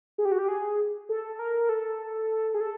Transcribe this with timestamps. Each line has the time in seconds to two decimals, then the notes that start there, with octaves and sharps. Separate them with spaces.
0.18 G#4
0.25 G4
0.32 F#4
0.39 G4
0.48 G#4
1.09 A4
1.39 A#4
1.69 A4
2.54 G#4
2.61 A4